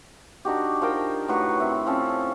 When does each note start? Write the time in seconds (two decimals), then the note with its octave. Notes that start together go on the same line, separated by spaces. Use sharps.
0.45 D4 D#4 F#4 G4
0.81 F3 A#4 G5
1.28 A2 F#3 B4 C#6
1.60 C4 E4
1.86 F3 C4 C#4 A4